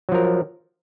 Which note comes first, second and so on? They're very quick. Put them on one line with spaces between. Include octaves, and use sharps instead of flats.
F#3 F3 A#4